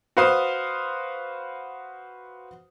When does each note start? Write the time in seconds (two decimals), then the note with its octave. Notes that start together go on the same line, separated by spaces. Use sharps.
0.17 F#4 B4 C5 F5 C6 D#6